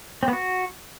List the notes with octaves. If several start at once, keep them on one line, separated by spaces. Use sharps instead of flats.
C4
B3
F#4